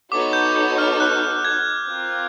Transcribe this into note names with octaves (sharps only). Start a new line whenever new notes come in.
B3 D#4 F#4 A4 C#5 D6
G6
G6
F6
F#6
G#6
C4 F4 A#4